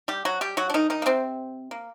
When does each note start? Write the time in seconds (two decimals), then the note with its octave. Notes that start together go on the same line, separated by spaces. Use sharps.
0.08 G3 G4
0.25 F#3 F#4
0.41 G3 G4
0.57 F#3 F#4
0.70 D4
0.74 D#3 D#4
0.90 D#3 D#4
1.02 A#3
1.06 C3 C4
1.71 A#3